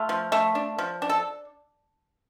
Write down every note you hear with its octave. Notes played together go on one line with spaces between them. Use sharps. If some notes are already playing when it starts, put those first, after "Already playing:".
Already playing: A3 F4
F3
A3
D4
F3
D4
A4